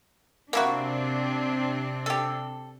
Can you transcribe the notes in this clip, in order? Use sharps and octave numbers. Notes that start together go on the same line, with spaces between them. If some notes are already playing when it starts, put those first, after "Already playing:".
C3 A#3 C4 D4 E4 F#4
G4 A4